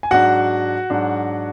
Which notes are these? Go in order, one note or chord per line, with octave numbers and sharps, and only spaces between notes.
G#5
G#2 F#3 D4 F#4 F#5
G#2 F#3 D4